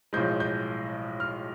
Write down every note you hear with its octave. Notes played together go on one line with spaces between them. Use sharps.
B1 A2 F3 G#3 G6
G6
F6